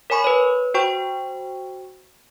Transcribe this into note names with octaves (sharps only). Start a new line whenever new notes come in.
A#4 C#5 G#5 B5 C#6
B4 C#5
F#4 C5 G5 C#6